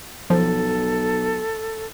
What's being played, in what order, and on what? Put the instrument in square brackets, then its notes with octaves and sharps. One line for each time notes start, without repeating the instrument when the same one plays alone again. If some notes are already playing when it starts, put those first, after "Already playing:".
[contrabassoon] B1 [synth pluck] F3 [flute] A4